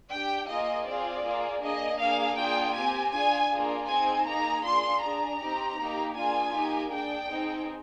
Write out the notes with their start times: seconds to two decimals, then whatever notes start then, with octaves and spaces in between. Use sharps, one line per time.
0.11 D4 G4 G5
0.48 A#3 F4 G#4 D#5
0.86 C4 F4 G#4 D5
1.24 A#3 F4 G#4
1.62 A#3 D4 G#4 D#5
2.00 A#3 D4 G#4 F5
2.37 A#3 D4 F4 G#4 G5
2.75 C4 G4 G#5
3.12 D4 F4 G#4 G#5
3.51 A#3 D4 F4 G#4
3.88 C4 D#4 G#4 G#5
4.26 A#3 D#4 G#4 A#5
4.64 D4 F4 G#4 C6
5.01 D4 G#4 A#5
5.40 C4 D#4 G4
5.77 A#3 D#4 G4
6.15 A#3 D4 F4 G#4 G#5
6.53 A#3 D#4 G4
6.91 D4 G#4 G5
7.28 C4 D#4 G#4